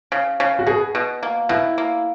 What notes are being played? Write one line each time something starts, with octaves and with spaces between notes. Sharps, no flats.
C#3
C#3
F#4
B2 G#4
B2
A#3
B2 E4
A#3